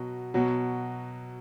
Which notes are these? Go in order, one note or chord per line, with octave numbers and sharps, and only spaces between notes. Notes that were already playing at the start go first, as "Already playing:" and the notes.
Already playing: B2 F#3
B2 F#3